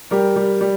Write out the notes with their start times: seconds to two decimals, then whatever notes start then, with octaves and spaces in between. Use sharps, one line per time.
0.11 G3 G4 A#4
0.36 G3
0.61 G3